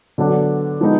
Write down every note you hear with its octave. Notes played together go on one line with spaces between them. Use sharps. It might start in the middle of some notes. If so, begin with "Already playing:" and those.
D3 F#3 B3 D4
F3 G#3 B3 D#4